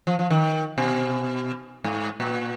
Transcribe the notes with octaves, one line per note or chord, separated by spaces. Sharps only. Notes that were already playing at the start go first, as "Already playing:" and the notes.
F3
F3
D#3
B2
G#2
A#2